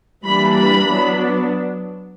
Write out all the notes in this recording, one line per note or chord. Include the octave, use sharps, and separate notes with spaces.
E3 G3 A#3 D4 B5
B5
F#3 B3 D4